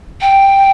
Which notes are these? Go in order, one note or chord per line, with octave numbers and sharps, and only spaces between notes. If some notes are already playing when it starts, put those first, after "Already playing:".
G5